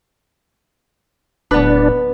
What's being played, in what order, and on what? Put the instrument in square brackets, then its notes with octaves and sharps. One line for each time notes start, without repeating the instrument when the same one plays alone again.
[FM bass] D1 [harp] B3 B4 [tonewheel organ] D4